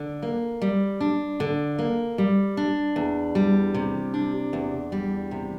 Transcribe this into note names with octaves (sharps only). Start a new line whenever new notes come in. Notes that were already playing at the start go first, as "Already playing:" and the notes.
Already playing: D3
A#3
G3
D4
D3
A#3
G3
D4
E2
G3
C3
D4
E2
G3
C3